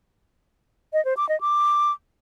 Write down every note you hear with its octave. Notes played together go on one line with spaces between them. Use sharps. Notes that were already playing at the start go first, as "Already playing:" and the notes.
D#5
C5
D6
D#5
D6